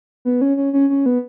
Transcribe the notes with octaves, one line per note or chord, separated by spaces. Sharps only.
B3
C#4
C#4
C#4
C#4
B3